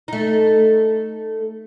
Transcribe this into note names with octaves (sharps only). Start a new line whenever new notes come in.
A3 D#4